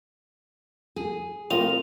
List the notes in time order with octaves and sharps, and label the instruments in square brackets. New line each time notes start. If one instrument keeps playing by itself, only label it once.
[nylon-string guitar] G#4
[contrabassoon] F2 [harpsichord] A2 F4 [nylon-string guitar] A#4 D#5 [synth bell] F7